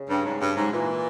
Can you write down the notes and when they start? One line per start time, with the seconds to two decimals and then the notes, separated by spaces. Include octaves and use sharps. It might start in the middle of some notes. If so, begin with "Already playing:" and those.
Already playing: C#3
0.09 G2
0.25 G#2
0.40 G2
0.56 G#2
0.72 A#2 E3